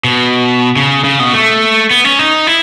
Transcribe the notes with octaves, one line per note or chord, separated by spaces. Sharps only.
B2
C#3
C#3
B2
A3
B3
C#4
D#4
E4